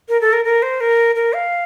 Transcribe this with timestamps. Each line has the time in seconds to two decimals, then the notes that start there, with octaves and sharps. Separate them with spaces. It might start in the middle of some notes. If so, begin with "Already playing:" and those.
0.09 A#4
0.21 A4
0.33 A#4
0.45 A#4
0.62 C5
0.81 A#4
1.15 A#4
1.33 F5